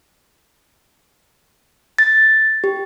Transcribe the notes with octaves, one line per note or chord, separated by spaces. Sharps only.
A6
G4